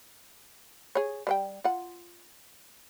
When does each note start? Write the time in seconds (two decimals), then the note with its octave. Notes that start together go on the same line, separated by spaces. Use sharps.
0.95 G#4 C#5
1.27 G3 C5 G5
1.64 F4 F#5